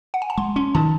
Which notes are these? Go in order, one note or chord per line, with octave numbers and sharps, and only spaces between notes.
F#5
G#5
A5
G#3 C6
C#4 C6
D#3 A5